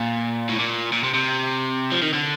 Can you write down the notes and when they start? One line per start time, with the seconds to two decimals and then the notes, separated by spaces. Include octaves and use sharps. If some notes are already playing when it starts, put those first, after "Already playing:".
Already playing: A#2
0.49 A2
0.59 A#2
0.92 A#2
1.04 C3
1.15 C3
1.92 F3
2.02 D#3
2.13 D3